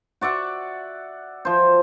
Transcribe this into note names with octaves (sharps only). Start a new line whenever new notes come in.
F#4 D5 E5 F#5
F3 C5